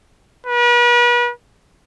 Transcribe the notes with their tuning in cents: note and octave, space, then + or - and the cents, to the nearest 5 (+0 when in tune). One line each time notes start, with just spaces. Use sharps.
B4 -40